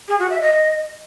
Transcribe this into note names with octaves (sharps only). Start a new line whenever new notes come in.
G#4
F#4
E5
D#5